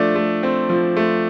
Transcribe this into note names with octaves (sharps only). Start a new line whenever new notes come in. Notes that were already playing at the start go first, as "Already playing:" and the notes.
Already playing: F3 A3 D4
A3
C4
F3
A3